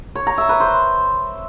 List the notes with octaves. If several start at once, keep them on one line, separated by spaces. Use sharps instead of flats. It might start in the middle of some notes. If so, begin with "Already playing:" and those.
C#5
A#5
E5
B4
C5